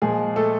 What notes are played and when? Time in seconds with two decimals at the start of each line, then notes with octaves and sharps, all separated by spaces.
0.02 A#2 F3 G#3 G#4
0.36 A3 A4